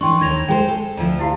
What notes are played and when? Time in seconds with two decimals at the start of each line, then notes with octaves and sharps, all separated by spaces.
0.01 E3 D4 G5 C6 C#6
0.21 D#2 D#3 G#6 A#6 F7
0.48 G#3 A#4 C5 G5
0.69 A4
0.97 D2 F3
1.19 E4 G4 F5